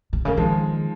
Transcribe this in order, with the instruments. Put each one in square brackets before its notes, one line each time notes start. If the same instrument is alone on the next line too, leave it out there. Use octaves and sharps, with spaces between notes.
[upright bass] C3
[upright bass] C#3 [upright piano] A#3
[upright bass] D#3 [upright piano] F3 G#3